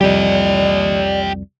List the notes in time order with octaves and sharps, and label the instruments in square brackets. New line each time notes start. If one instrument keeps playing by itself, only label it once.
[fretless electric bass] C2 F2 G3 [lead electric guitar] G4 D#5 [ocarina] D5